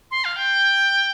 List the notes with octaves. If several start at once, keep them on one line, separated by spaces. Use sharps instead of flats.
C6
F5
G5